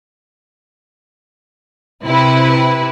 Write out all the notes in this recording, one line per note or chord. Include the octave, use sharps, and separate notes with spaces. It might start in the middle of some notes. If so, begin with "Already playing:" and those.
C3 E4 B4